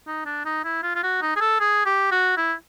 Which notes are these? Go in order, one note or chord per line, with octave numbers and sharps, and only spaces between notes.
D#4
D4
D#4
E4
F4
F4
F#4
D#4
G#4
A4
G#4
G4
F#4
E4